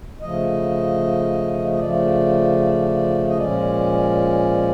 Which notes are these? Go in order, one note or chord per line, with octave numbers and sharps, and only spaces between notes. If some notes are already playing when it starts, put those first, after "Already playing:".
C#3 F3 A3 D#5
D#5
C#3 F3 A3 D5
D#5
A#2 F3 G#3 C#4 D5